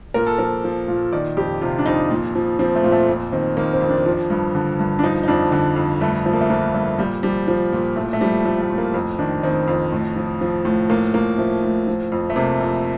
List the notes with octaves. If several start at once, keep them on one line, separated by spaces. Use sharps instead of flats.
A#2 A#4
A4
F3 A#4
F3
A#2
D#3 D5
F2 G4
C3 F4
D4
F2 D#4
A#2
F3
F3 C4
A3
A#2
A3
F2
D#3 C4
D#3 A#3
C4
F2
D4
F3
G2
D3
G2
D4
F3 D#4
D#4
F2 D4
D3
F2
G2 A3
F3 A3
A#3
A3
F3 A#3
G2 A3
A#2 G3
F3 G3
F3
A#2
A2 A3
A3
F3 G3
F3 A3
A3
A2
A#3
F2 C4
D#3 D4
D#3 C4
F2
A2
F3
F3
A2
A2 A#3
F3 A#3
F3 A3
A2
F3
F2
A3
C3 A#3
F2